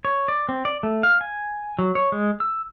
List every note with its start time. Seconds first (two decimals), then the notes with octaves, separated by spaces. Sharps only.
0.05 C#5
0.28 D5
0.49 C4
0.65 D5
0.83 A3
1.03 F5
1.21 G#5
1.79 F#3
1.95 C#5
2.12 G#3
2.40 E6